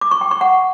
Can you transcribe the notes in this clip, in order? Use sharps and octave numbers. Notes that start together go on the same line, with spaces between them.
D6
C#6
G5
C#6
F#5